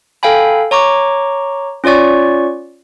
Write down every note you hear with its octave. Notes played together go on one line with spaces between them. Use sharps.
A4 F5 G5 G#5 B5
C#5 A#5 C#6 D6
C#4 F4 C#5 D5 C#6